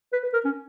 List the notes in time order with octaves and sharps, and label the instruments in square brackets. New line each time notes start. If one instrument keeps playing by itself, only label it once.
[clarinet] B4
B4
A#4
C#4